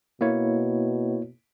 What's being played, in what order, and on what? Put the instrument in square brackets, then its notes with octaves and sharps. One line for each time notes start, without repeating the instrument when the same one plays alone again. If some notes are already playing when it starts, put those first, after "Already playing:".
[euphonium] B2 [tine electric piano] A#3 E4 C#5